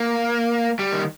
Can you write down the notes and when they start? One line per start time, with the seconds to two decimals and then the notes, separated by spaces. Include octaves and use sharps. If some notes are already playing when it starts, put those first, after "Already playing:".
Already playing: A#3
0.79 G3
0.92 D#3